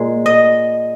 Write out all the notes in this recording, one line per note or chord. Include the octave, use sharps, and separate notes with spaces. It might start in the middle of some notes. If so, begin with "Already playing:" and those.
Already playing: A#2 G#3
D#5